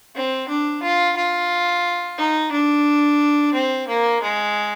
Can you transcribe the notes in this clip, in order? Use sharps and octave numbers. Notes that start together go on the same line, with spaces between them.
C4
D4
F4
F4
D#4
D4
C4
A#3
G#3